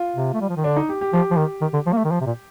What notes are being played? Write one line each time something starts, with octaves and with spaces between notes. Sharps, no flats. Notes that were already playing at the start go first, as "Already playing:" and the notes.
Already playing: F4
C3
A3
G3
F3
D#3
D3 D4
D#4
G4
G4
F3 G4
F3
D#3
D#3
D3
F3
A#3
A3
D#3
F3
C3
A#2